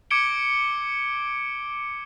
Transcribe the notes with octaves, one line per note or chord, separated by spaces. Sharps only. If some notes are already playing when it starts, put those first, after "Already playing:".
D6 G#6 C#7 D7 G7